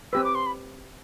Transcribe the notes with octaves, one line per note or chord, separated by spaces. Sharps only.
C4 G4 B4 E6
D6
C6
B5